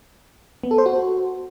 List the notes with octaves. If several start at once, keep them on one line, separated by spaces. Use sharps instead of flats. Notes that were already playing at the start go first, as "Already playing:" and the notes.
B3
A4
C5
F#4